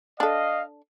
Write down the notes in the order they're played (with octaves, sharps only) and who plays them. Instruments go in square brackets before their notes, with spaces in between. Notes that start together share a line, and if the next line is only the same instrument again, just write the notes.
[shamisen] D4 A4 [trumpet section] D#5 F5